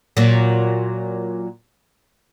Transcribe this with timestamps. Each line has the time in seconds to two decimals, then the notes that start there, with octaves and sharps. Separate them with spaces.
0.17 A#2 F#3